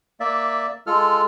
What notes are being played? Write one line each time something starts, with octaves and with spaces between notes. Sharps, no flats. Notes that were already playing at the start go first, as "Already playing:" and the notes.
A#3 D5 E5
G#3 F4 A4 F6